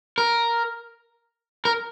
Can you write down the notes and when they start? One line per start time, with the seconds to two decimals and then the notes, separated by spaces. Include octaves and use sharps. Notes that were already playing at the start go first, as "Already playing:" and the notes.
0.18 A#4
1.65 A#4